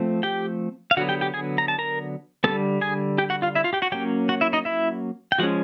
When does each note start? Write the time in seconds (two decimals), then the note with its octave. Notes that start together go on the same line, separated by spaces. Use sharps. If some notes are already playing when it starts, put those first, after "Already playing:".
Already playing: F3 A3 C4
0.23 G4 G5
0.91 F5
0.97 D3 F#3 B3 F#4 F#5
1.09 G4 G5
1.21 G4 G5
1.34 G#4 G#5
1.58 A#5
1.68 A5
1.79 A#4 A#5
2.44 D3 G3 B3 A4 A5
2.81 G#4 G#5
3.18 G4 G5
3.30 F#4 F#5
3.42 F4 F5
3.55 E4 E5
3.64 F4 F5
3.73 G4 G5
3.82 F#4 F#5
3.92 F#3 A#3 C#4 G4 G5
4.29 F#4 F#5
4.41 E4 E5
4.53 D#4 D#5
4.65 E4 E5
5.32 G5
5.38 F3 G#3 C#4 F#4 F#5